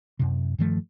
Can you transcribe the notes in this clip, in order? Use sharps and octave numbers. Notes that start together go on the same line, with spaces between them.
F#2 C3
G2 D#3 F3 A3